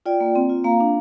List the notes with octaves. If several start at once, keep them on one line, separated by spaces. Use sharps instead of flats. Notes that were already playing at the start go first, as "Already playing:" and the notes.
F4 D5 G5
A#3
C4
F4
A#3 F5 A#5
D4